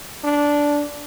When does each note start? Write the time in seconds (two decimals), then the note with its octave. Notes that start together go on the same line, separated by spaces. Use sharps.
0.24 D4